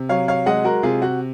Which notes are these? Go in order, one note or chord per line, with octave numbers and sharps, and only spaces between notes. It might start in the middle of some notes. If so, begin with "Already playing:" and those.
Already playing: C3
F#3 C#5 F5
C#5 F5
G#3 D#5 F#5
F#4 A#4
C3 F4 G#4
F#4